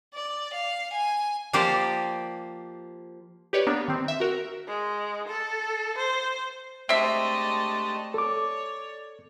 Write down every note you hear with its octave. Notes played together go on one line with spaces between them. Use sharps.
D5
F5
G#5
F3 A#3 G4 C5 D5
G4 B4 C#5 D5
A#3 B3 D4
D#3 C4
E5
F#4 A#4
G#3
A4
C5
G#3 A3 C4 D4 G4 D#5 E5
A4 C#5 D5 D6